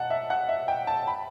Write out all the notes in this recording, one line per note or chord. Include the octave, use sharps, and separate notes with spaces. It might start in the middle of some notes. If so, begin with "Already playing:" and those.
Already playing: F#5 A5
E5
F#5
E5
G5
A5
B5